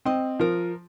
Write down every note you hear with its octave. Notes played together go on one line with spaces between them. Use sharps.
C4 D#5
F3 A#4